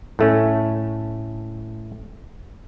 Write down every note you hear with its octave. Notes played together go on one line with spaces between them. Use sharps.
A2 A3 C#4